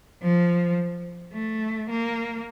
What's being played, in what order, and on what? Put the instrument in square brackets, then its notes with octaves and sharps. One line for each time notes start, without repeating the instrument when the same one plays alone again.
[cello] F3
A3
A#3